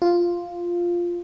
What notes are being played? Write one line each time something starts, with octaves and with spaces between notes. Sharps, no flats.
F4